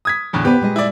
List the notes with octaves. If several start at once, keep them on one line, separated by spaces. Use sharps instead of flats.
D#6 G#6 B6
E2 A2 D3
B3 G4 B4 C5 D5
A#2 G#3 D#5
E4 D5